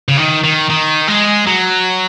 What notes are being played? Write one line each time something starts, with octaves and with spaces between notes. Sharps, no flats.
C#3
D#3
D#3
D#3
G#3
F#3